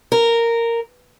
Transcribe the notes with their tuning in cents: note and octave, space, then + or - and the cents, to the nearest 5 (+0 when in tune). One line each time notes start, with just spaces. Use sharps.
A#4 -10